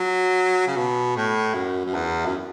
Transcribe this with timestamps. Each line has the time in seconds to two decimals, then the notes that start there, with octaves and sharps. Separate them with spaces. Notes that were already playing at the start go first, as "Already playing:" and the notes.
Already playing: F#3
0.67 C#3
0.77 B2
1.16 A2
1.54 F#2
1.85 F#2
1.94 E2
2.26 F#2